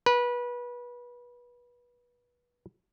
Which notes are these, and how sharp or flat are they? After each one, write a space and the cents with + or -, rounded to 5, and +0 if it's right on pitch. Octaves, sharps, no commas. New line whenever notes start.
B4 -25